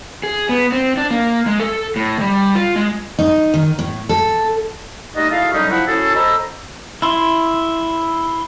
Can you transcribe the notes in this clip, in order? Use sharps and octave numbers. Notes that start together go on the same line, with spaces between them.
G#4
B3
C4
D4
A#3
G#3
A4
A2
G3
F4
G#3
D#4
D#3
A2
A4
G3 A3 D#4 F4 F#4 D#5
E4 F#4 G#4 A4 D#5 F5
D3 F#3 G3 C#4 D#4
F3 E4 F#5
C#4 E4 F#4 G#4 A4
A4 C5 D#5 A#5 B5 E6
E4 C6